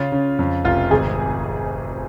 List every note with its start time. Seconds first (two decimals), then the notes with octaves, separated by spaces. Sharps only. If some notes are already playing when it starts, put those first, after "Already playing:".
Already playing: C#3 C#4 F4
0.12 C#3
0.39 F2
0.65 F1 F4
0.90 G#1 G#4